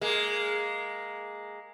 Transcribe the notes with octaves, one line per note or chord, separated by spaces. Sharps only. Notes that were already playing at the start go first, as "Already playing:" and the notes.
G#3 A#3